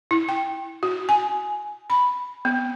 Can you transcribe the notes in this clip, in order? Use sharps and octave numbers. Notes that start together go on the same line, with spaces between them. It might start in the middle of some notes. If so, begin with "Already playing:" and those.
E4
G5
F#4
G#5
B5
B3